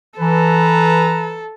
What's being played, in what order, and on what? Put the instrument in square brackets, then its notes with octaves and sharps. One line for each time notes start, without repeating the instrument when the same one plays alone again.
[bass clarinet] E3 [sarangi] A4 [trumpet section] B4 A#5